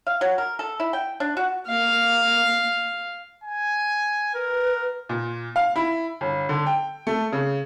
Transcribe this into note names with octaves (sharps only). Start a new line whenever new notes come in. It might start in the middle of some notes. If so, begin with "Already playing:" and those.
F5
F#3
A#4
A4
E4
G5
D4
F#4
A#3 F5
G#5
A#4 B4
A#2
F5
E4
G1
D3
G5
A3
C#3